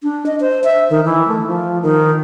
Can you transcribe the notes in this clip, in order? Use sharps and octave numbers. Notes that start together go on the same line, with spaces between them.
D4
D#5
C5
E5
D#3
E3
A3
F3
D#3